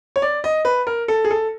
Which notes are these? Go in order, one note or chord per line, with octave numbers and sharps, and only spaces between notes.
C#5
D5
D#5
B4
A#4
A4
G#4
A4